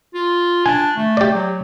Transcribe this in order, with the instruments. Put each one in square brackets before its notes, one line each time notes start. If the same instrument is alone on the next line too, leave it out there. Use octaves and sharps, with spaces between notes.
[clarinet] F4
[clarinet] D4 [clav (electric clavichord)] G#5
[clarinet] A3
[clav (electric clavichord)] G4 D5
[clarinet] F#3